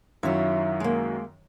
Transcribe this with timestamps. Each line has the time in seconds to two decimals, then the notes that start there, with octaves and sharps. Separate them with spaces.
0.23 F#2 D#3 F#3 E4 F4 C#5
0.80 G#3 A#3